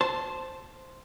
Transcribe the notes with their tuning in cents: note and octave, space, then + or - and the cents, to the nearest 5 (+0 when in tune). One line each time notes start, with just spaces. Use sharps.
C5 +0 A5 +0